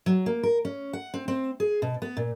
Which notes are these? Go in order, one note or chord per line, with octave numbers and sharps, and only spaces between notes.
F#3
A#3
A#4
C#4
F#5
C4
C4
G#4
B2
B3
A#2